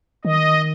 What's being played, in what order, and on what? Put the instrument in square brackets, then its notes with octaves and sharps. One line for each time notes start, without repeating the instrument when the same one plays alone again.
[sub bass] D#3 [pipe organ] D#5